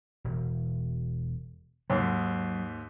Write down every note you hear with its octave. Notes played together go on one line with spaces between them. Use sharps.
E1
D#2 G#2 F#3